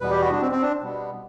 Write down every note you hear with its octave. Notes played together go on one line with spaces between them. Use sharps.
E2 B2 G3 B3 B4
G4
F#4
D4
C4
C4
D4
B2 G3 B3